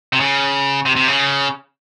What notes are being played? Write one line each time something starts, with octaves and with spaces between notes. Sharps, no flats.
C3
C#3
C3
C3
C#3